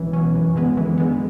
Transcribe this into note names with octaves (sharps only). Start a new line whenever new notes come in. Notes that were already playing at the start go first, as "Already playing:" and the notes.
Already playing: C#2 B2 E3 F#3 C#4
B2 F#3 C#4
F#2
D3 G#3 B3
F#2 E3
D3 G#3 B3